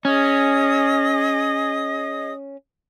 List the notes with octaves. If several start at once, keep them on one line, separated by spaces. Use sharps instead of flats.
C#4 G#4 D#5 D#6